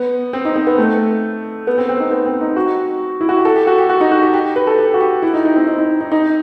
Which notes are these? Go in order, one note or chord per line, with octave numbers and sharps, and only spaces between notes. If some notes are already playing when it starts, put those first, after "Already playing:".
Already playing: B3
C4
D#4
C4
B3
A3
B3
C4
C4
D#4
B3
C4
D#4
F#4
E4
F#4
G4
A4
G4
F#4
G4
F#4
D#4
F#4
G4
G4
B4
A4
G4
F#4
G4
E4
D#4
D#4
C4
D#4
D#4
D#4
D#4